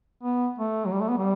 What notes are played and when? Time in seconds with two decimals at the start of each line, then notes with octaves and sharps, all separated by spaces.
0.23 B3
0.58 A3
0.85 F#3
0.92 G3
1.01 A3
1.09 B3
1.18 G3